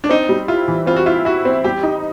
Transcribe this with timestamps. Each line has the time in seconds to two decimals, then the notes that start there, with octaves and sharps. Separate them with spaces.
0.04 D4
0.09 C4 D#4
0.29 G3
0.48 E4 F4
0.68 E3
0.86 C4 F4
0.96 F#4
1.06 E4 F4
1.25 E4 F#4
1.45 C4
1.64 G3 G4
1.83 D#4